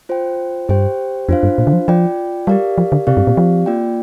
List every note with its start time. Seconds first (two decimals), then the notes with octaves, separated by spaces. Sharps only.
0.09 F4 C5 G5
0.68 G2 G4 C5 G5
1.29 F2 D4 F4 C5 F5
1.43 G2
1.58 A#2
1.67 D3
1.73 F3
1.88 F3 F4 D5 G5
2.47 G3 G4 A#4 D5 F5
2.78 F3
2.92 D3
3.07 C3 C4 G4 D5 F5
3.17 G2
3.27 A#2
3.37 F3
3.66 A#3 F4 D5 G5